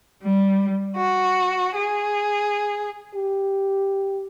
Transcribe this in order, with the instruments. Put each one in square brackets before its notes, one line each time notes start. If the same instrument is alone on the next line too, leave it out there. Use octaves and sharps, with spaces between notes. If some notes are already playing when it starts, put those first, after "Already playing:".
[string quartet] G3
F#4
G#4
[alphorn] G4